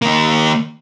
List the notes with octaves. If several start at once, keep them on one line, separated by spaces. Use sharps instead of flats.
D#3 A#3